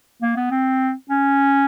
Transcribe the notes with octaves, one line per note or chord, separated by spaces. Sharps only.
A#3
B3
C4
C#4